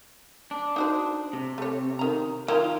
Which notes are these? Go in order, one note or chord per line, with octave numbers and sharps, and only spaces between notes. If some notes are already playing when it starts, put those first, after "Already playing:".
D4
D#4 F#4 C5
C3
A3 C#5
D#3 A#5
D#3 E4 F4 A#4